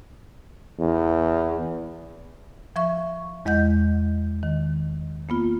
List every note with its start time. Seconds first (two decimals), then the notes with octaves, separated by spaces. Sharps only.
0.79 E2
2.76 F3 E5 C#6
3.45 E2 G#3 D#5 F#5 G6
4.43 D#3
5.29 A#3 B3 F4